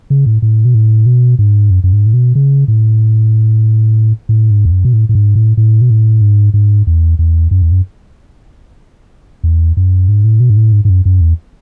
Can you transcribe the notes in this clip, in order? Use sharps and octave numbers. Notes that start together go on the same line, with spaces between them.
C#3
A2
A2
B2
A2
B2
G#2
F#2
F#2
G#2
A2
B2
C#3
A2
A2
G#2
E2
F#2
B2
A2
A2
G#2
A2
A2
B2
A2
G#2
G#2
E2
E2
F#2
E2
F#2
E2
F#2
G#2
A2
B2
G#2
A2
G#2
G#2
F#2
F#2
E2